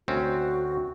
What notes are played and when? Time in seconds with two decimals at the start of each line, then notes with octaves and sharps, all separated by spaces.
0.08 D2 C4 C#4 F#4